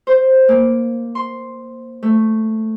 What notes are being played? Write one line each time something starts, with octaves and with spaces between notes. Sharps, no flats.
C5
A#3
C6
A3